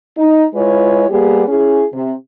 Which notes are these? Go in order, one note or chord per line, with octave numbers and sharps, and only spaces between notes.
D#4
G#3 E4 F4 B4 C#5
G3 A#3 B3 G4 G#4
C#4 E4 G#4
C3